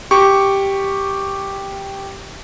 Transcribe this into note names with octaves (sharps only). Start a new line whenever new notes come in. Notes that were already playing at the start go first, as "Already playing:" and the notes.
G4 C#6